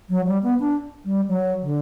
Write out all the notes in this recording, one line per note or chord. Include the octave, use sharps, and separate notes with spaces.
F#3
G3
B3
D4
G3
F#3
D3